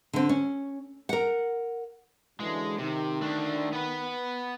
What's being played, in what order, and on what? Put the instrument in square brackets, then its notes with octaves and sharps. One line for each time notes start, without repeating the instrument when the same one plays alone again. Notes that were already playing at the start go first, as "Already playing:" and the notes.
[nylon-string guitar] D3 C4
C#4
A#4 F#5
[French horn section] F#2 D3 E3 [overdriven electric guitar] G#3
[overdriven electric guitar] C3 [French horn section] D#3
[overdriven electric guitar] A3 D4
B3 B4